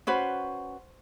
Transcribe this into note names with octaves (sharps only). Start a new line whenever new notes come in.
C#4 F#4 B4 C5